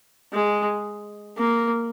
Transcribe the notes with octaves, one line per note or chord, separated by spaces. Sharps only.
G#3
A#3